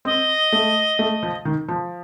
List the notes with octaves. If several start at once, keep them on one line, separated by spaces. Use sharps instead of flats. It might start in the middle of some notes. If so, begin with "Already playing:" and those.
C4 D#5
A3
A3
F3
D#3
F3